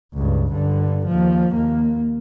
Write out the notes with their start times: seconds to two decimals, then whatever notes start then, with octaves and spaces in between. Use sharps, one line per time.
0.14 C#2 G2
0.51 G2 D3
1.07 D#2 F3
1.54 D#2 A#3